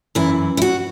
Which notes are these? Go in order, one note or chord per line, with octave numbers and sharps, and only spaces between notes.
F#2 E3 E4
E4
F#4